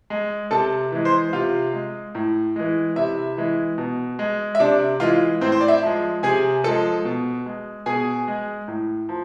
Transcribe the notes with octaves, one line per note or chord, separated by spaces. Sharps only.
G#3
C3 A4 A5
E3 G#3
C5 C6
C3 F4 F5
G#3
A2
E3 G#3
C3 E4 E5
E3 G#3
B2
G#3
E5
C3 D4 D5
E3 G#3 F4
A2 C4 C5
C5
D5
E4 E5
F3 G#3
C3 G#4 G#5
F3 G#3 A4 A5
B2
G#3
B2 G#4 G#5
G#3
A2
F3